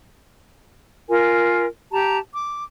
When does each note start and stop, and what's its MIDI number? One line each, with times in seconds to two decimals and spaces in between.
1.09 1.66 65
1.09 1.66 70
1.09 1.66 80
1.92 2.18 67
1.92 2.18 81
1.92 2.18 82
2.35 2.63 86